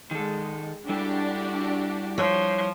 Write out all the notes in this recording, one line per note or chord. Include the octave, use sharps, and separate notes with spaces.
D#3 G#3 A4
G3 D4 E4 F#4 G4 A4
F3 C#5